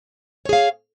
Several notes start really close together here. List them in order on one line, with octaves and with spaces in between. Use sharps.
C#5 G#4 F5